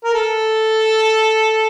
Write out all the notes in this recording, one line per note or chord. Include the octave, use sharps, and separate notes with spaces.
A#4
A4